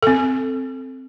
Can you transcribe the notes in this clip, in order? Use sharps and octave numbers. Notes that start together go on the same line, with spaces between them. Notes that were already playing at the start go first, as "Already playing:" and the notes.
C4 A4